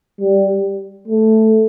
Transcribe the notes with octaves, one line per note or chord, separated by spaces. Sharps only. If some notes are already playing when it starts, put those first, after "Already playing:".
G3
A3